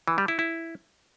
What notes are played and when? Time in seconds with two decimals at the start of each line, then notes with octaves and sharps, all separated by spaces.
0.08 E3
0.18 G3
0.28 E4
0.39 E4